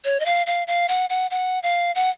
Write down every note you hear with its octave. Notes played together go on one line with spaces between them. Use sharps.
C#5
D#5
F5
F5
F5
F#5
F#5
F#5
F5
F#5